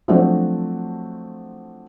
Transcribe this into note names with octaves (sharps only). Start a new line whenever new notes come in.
F3 F#3 A3 C4 D4 F#4